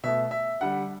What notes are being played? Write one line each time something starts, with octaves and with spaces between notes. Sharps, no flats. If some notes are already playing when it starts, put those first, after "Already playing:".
B2 A3 E5
E5
D3 G3 F#5